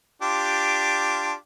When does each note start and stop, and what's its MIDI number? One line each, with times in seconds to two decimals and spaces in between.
0.22 1.33 62
0.22 1.33 65
0.22 1.33 67